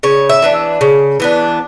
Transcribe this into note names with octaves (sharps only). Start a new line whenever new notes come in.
C#3 C#5
E5
E3 B3 D4
C#3
E3 B3 D4